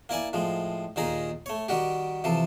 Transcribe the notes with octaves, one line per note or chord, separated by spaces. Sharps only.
A#3 E4 D5 G#5
A2 F3 G#3
D#2 A#2 D#3 D#4 G#4 A#5
A3 C#5
D#3 G3 F#4 G4
C3 E3 F3 A4